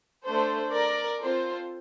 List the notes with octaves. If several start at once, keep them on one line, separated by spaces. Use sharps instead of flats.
A3 D4 A4 C5
A#4 D5
C4 F4 A4 C5